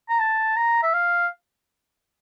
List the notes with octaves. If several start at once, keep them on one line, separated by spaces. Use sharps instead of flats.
A#5
A5
A#5
E5
F5